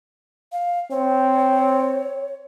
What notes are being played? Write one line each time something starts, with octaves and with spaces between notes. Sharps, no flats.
F5
C4 C#5